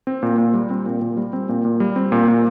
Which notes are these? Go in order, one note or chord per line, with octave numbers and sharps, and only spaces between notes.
C4
A#2
A#2
G3
C4
A#2
A#2
G3
C4
A#2
A#2
G3
C4
A#2
A#2